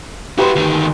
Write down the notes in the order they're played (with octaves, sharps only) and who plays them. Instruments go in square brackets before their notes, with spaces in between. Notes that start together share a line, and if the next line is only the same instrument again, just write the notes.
[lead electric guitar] E4 F#4 [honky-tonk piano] G4 B4 C6
[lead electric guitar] D2 D#3